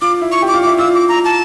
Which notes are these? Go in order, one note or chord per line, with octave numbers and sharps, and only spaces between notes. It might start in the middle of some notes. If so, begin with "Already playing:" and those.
F4 D6
E4
C#6
G4
D6
F4
E4 D6
F4 E6
D6
A#5
A5